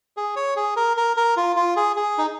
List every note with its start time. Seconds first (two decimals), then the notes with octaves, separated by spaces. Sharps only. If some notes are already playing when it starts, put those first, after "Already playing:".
0.17 G#4
0.36 C#5
0.56 G#4
0.76 A#4
0.97 A#4
1.17 A#4
1.37 F4
1.56 F4
1.76 G#4
1.96 G#4
2.18 D#4